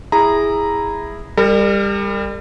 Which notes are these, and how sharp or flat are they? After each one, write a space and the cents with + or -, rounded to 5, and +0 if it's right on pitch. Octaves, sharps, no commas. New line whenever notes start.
E4 +0 G#4 -15 A#5 +0
G3 +30 A#4 -35